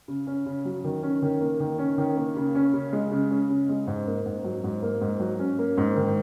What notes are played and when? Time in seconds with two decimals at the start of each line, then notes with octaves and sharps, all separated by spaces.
0.08 C#3
0.27 C#4
0.46 C#3
0.65 F#3
0.84 D#3
1.03 C#4
1.23 D#3
1.41 A#3
1.60 D#3
1.79 C#4
1.98 D#3
2.17 A#3
2.36 C#3
2.55 C#4
2.74 C#3
2.93 G#3
3.11 C#3
3.31 C#4
3.50 C#3
3.69 G#3
3.87 G#2
4.07 A#3
4.26 G#2
4.44 F#3
4.64 G#2
4.82 A#3
5.01 G#2
5.20 F#3
5.39 C#4
5.59 A#3
5.77 G#2
5.96 D#3